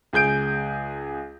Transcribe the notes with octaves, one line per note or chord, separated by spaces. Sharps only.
C#2 G#4 G6 D7